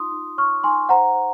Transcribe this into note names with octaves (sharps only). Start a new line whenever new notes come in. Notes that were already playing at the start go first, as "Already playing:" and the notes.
Already playing: D#4 F4 C6 D#6
D#4
C#5 C#6 F6
D#4 G#5 C6
C5 F#5 A#5
C5